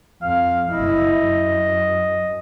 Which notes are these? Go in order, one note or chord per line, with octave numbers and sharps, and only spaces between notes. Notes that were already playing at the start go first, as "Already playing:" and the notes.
F2 F5
F#1 E4 D#5
F#2